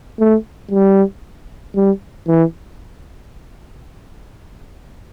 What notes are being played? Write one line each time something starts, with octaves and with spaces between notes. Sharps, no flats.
A3
G3
G3
E3